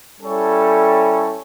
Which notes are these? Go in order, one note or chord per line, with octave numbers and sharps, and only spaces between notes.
G3 C#4 E4 A4 C#5